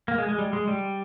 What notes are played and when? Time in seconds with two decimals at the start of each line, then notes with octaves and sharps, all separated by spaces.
0.08 A#3
0.18 G#3
0.29 G#3
0.38 G3
0.53 G#3
0.68 G3